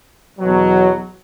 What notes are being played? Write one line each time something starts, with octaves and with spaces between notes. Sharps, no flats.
E2 B2 F#3